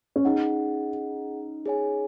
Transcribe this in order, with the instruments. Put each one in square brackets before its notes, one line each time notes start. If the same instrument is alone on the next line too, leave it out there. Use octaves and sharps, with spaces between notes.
[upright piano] C#4
[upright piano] D#4 [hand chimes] G#4 D#5 F#5
[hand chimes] G#4 C#5 G#5